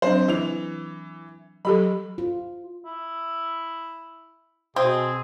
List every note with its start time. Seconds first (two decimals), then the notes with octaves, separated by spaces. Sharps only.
0.02 F#3 C4 D4 C5
0.28 E3 F7
1.65 F#3 G4 A4 B5
2.18 F4
2.86 E4
4.76 B2 C4 G#4